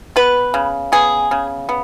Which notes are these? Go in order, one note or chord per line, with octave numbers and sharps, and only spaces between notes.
B3 B4
C#3
B3 G#4
C#3
B3